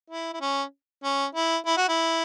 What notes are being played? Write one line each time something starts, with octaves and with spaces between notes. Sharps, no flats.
E4
E4
C#4
C#4
E4
E4
F#4
E4